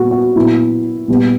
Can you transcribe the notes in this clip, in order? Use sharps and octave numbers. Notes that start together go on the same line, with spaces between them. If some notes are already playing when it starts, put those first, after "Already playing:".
Already playing: A#2 G3 B3 F#4
F#4
A#2 F#3 B3 E4
A#2 G3 B3